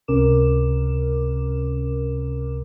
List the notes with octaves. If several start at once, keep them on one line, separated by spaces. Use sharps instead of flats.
C#2 C3 C#4 A#4 D6 E7